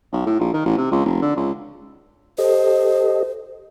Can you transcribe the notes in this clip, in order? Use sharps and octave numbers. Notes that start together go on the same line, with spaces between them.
B1
A2
A#1
D#3
A1
C3
C#2
F1
D3
C#2
G4 A4 C5 D#5